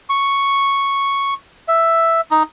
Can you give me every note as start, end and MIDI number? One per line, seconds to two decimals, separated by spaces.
0.09 1.34 85
1.68 2.21 76
2.31 2.43 63